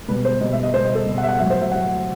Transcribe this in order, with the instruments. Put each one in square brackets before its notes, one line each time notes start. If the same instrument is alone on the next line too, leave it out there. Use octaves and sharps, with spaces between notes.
[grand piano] B2 G3 B4
C5
B2 G3 D#5
E5
D#5
B2 C5
G3
D#5
A4
B2 G3
F#5
E5
F#5
A2 F#3 E5
C5
E5
A2 F#3 F#5